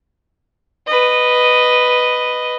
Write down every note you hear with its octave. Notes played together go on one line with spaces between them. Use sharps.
B4 D#5